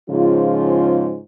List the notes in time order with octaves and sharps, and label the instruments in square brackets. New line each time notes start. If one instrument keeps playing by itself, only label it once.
[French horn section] G#2 C#3 F3 F4